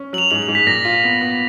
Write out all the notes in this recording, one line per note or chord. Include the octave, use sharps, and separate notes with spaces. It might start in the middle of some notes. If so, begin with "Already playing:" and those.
Already playing: C#4
F#3 F#7
F7
G#2 F#7
F#7
G#2
B6
A#2 A#6
F4
B3
B3